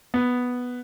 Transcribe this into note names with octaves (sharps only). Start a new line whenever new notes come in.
B3